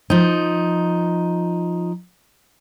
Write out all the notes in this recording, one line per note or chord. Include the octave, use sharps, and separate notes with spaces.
F3 D#4